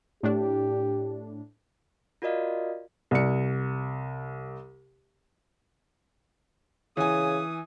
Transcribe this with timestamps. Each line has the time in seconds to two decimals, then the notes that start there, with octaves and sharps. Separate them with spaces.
0.23 A2 D4 G4
2.22 F4 F#4 A#4 D5 D#5 F5
3.11 C2 C#7
6.97 C#3 E3 G#5 D#6